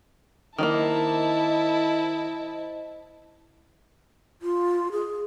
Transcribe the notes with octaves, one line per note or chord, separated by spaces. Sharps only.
D#3 G#3 A#3 E4 C5 D#5 A5
F4
G#4